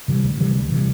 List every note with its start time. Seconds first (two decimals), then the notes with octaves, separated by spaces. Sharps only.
0.08 C3 E3 G3
0.23 D2
0.40 C3 E3 G3
0.56 D2
0.72 C3 E3 G3